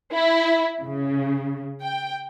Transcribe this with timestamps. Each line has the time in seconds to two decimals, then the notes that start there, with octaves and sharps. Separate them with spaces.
0.13 E4
0.82 C#3
1.81 G5